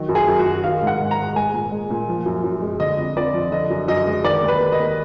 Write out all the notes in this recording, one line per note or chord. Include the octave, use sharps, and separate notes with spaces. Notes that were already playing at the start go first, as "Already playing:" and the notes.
Already playing: D#3 F#3
F#2
G#4
F#2
F#4
F#3
D#3 F5
G#2
F#5
G#2
A#5
G#3
G#3 G#5
A#2
G#3
A#2
F3
F#2
F#2
G#3
D3 D#5
F2
F2 D5
F3
D3 D#5
F#2
F#2 D#5
G#3
D#3 D5
D#2
B4
D#2
D#5
A#3